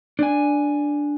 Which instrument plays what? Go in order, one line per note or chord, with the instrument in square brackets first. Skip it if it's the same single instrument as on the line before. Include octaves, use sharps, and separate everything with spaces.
[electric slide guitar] D4 G#5